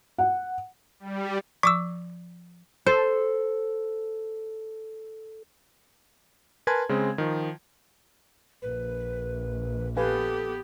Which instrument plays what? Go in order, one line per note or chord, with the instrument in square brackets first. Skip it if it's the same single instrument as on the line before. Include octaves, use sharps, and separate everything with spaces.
[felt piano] F#5
[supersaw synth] G3
[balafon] F3 [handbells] C#6 D6 E6
[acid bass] A4 [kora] C5
[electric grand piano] A#4 B4 G#5 A5 C6 G#6
C#3 G#3 C4
D#3 F3
[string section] A#1 [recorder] B4
[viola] B3 G4 [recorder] A4 [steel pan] B4 F5 G#5